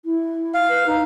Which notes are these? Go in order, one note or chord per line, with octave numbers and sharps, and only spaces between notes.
E4
F5
B4
D#4